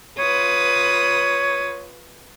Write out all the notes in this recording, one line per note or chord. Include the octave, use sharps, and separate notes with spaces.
F4 B4 C#5 D#6